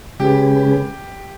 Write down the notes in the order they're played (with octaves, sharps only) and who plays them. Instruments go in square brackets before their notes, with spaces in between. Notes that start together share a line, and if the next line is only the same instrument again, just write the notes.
[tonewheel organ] C#3 G#3 C#4 G#4 B4 [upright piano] G4